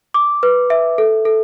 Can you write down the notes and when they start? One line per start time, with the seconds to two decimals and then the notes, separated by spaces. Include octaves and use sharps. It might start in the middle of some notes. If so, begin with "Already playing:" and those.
0.14 D6
0.43 B4
0.70 E5
0.98 A4
1.25 A4